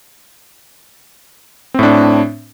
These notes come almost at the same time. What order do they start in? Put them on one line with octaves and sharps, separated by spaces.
C4 A2 D4